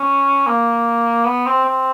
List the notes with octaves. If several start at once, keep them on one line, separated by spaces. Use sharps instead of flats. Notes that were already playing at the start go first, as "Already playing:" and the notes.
Already playing: C#4
A#3
B3
C4
C4